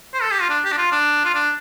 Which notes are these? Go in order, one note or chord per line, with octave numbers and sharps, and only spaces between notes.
C5
A4
G4
F4
D4
G4
D4
F4
D4
F4
D4